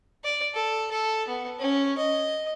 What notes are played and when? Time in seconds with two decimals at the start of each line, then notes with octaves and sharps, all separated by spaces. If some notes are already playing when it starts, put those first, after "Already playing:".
0.24 D5
0.54 A4
0.91 A4
1.28 B3
1.59 C#4
1.98 D#5